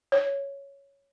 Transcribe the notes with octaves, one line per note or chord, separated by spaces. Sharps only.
C#5